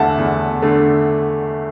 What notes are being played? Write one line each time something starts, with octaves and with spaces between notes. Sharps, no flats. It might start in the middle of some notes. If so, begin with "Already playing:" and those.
Already playing: E2 D3 A3 E5 F#5 A5
E2
D3 A3